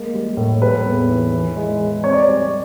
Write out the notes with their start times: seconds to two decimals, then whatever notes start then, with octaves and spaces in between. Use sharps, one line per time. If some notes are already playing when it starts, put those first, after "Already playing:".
Already playing: G#3 A#3
0.14 G3
0.37 A2
0.62 G3 B4
0.86 E2
1.09 E3
1.32 E3
1.56 G#3
1.80 G#3
2.04 C4 C#5
2.12 D5
2.20 C#5
2.28 G3